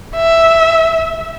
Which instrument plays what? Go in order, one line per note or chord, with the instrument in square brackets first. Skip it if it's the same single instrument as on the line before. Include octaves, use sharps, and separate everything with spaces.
[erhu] E5